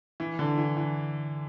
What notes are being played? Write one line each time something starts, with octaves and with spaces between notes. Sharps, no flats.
E3
D3
E3
E3